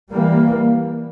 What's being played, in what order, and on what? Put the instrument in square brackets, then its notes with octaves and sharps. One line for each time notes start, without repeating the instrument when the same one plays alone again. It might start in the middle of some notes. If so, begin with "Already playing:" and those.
[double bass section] E3 G3 A#3